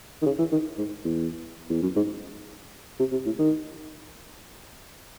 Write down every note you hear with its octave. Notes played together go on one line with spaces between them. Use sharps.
D#3
C#3
E3
D#3
G#2
E2
E2
F#2
G#2
C3
C3
A2
D#3